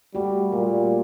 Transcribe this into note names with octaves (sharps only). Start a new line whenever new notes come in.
G3 A3 F#4
A#2 G3